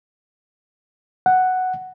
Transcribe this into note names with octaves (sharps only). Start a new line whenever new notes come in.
F#5